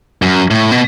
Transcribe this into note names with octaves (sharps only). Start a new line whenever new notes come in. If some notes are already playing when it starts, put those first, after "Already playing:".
F#2
A2
B2